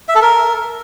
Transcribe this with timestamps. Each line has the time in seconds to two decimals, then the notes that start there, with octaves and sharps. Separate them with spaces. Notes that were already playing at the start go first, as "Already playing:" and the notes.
0.09 E5
0.15 A4
0.22 A#4